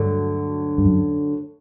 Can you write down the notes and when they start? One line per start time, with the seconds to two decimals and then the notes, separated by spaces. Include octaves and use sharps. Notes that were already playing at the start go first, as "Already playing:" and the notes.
Already playing: D2 G2 D3 F#3 A3 D4
0.78 G2
0.85 F#2